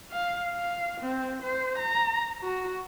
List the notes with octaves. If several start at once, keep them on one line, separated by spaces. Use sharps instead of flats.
F5
F5
C4
C5
A#5
F#4